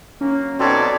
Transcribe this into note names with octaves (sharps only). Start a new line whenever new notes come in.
F#3 A#3 C#4
B2 C4 D#4 A4 C#5 D5